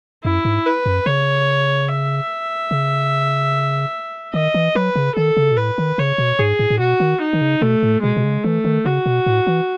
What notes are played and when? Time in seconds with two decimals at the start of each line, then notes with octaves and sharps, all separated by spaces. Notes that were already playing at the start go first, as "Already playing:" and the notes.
0.25 F#2 E4
0.45 G#2
0.66 B4
0.86 F#2
1.06 C#3 C#5
1.88 E5
2.71 C#3
4.34 D#3 D#5
4.54 E3
4.75 F#3 B4
4.96 C#3
5.16 D#3 A4
5.37 C#3
5.51 B2
5.57 A2 B4
5.78 D#3
5.98 C#3 C#5
6.18 B2
6.39 G#2 G#4
6.59 A2
6.70 A2
6.80 B2 F#4
7.00 D#3
7.21 D#4
7.33 D#3
7.41 C#3
7.61 B2 A3
7.83 A2
8.02 B2 G#3
8.17 B2
8.24 C#3
8.44 E3 A3
8.64 D#3
8.85 C#3 F#4
9.06 B2
9.26 A2
9.47 E3